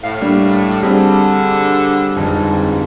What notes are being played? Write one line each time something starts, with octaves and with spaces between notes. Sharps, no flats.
A2 F5
G3 A#3 D4
D3 G3 C4 D4 G#4
G1 F2 G#2